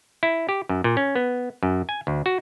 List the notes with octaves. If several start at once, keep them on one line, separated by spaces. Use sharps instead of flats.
E4
G4
F#2
A#2
C#4
B3
F#2
G#5
D2
F#4